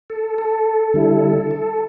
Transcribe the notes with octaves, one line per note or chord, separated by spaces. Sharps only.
A4
A4
D3 G3 E4
A4